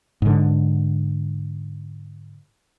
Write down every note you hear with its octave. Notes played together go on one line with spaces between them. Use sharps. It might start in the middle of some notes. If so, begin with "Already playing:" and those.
G#2 D3